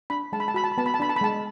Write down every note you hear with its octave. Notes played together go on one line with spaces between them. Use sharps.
D4 B5
G#3 A5
B5
A5
F#4 B5
A5
B5
B3 A5
B5
A5
D4 B5
A5
B5
G#3 A5